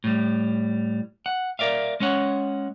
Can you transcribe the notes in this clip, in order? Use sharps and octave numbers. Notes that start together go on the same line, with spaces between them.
A2 G3
F#5
A#4 D5 E5 F5
G#3 C#4 C#5 F#5